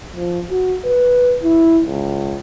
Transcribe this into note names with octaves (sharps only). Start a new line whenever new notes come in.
F3
F#4
B4
E4
C#2